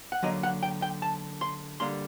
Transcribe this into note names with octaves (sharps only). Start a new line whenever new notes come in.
F#5
D3 F#3 A#3 D#5
F#5
G5
G5
A5
C6
D3 G3 A#3 C6